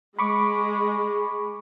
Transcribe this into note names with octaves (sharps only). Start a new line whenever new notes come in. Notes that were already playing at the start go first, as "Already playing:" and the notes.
G#3 B5 C#6 D6